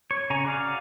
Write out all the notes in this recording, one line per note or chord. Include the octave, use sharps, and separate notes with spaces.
C#5
C#3 G#5 A#5 C#6
F#4 D5 F5